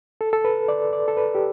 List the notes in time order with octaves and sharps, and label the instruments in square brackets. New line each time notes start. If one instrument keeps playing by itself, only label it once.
[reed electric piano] A4
A4
B4
D5
D5
A4
B4
G4